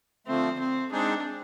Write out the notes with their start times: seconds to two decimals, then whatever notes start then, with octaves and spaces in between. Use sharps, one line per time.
0.27 D3 F3 A3 C4
0.59 C4
0.91 G#3 C4 D4 D#4 G#4